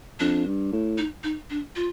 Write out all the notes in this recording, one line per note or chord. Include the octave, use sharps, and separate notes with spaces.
F2 D4
G2
A2
D#4
D#4
D4
F4